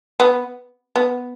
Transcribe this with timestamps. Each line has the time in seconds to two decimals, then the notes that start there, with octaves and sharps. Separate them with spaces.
0.20 B3
0.96 B3